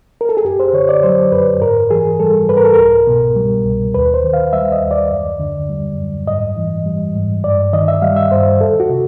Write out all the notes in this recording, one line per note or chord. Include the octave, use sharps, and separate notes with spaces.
A#4
A4
G#4
F#2 G4
C5
D3 C#5
D5
F#3 C5
F#2 B4
G#2 A#4
E3 G#4
G3 A4
G#2 B4
A#4
A4
C2 A#4
B2
G3
C2
D#2 B4
C5
D#3
F5
G3 E5
D#5
D#2
D5
F#2
D3
G3
F#2
G#2 D#5
E3
G3
G#2
G2 D5
D#3 D#5
E5
G3 F5
E5
G2 C5
E2 A4
F#4
C3